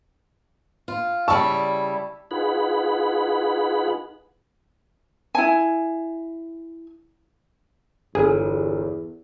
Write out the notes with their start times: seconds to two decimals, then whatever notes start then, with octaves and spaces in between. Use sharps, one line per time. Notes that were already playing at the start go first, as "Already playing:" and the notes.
0.88 F4
1.28 C#3 G3 E4 A5 C#6 E6
2.31 D#4 F4 G#4 B4 F#5 B5
5.35 E4 G#5
8.15 G1 E2 G#4